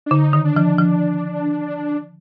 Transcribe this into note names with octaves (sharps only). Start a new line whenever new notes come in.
D4
D3 D#4
D#3
D4
F3
F3